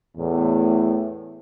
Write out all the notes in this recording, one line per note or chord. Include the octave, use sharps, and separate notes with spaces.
E2 A2